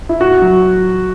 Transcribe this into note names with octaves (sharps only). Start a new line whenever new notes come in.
E4
A2 F#4
F#3